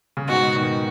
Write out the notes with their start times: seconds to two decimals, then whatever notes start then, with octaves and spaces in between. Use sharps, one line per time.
0.17 C#3
0.28 G#2 B2 F#4
0.56 B2 D#3